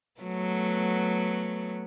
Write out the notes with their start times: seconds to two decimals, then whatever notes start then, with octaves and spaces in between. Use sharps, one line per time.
0.21 F#3 A3 B3